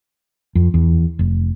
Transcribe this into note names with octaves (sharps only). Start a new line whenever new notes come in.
F2
E2
F1